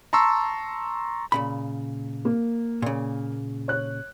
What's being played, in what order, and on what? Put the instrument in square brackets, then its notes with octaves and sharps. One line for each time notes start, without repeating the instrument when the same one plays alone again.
[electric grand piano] A5 A#5 C6 C#6 E6
[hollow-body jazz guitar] A#2 C#3 B5
[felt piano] A#3
[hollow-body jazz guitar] A#2 C#3
[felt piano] C#5 F#6